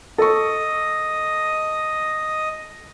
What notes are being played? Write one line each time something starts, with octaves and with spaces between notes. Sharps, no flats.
A4 D#5 C#6